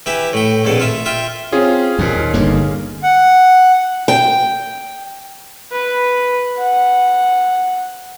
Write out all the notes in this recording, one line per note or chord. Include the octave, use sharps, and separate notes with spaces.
E3 G4 E5
A2 G5
A#1 F2 B2 A4
F4 E5
F4 E5 G5
C4 C#4 F4 G#4
D#2 A#2 D#4
G1 D3 A#3
F#5
G5
B4
F#5